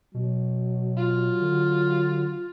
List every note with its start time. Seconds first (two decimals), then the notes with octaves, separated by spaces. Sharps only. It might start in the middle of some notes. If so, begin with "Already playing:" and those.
0.14 B2 F#3
0.97 F4
1.42 D3